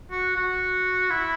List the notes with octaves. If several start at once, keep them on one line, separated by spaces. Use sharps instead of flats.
F#4
F#4
E4